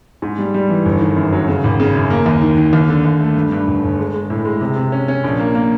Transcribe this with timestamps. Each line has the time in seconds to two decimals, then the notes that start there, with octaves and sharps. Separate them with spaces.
0.22 G#2
0.38 G3
0.54 G3
0.69 E3
0.85 G1
1.01 D#3
1.16 F#2
1.33 F#3
1.48 C#3
1.64 G#1
1.80 C#3
1.95 F#2
2.10 A#3
2.26 D#2
2.42 D#3
2.57 D#3
2.73 D#2
2.89 D3
3.04 D#2
3.20 A3
3.36 G2
3.52 G2
3.67 G1
3.83 G1
3.99 G#3
4.14 G#3
4.30 A2
4.45 G#3
4.61 C3
4.76 C3
4.92 C#4
5.08 C#4
5.24 A#1
5.39 A#3
5.55 A#3